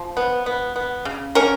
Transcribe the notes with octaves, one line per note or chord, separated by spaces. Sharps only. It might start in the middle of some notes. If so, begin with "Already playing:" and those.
Already playing: F3
B3
B3
B3
C#3
C#4 A#4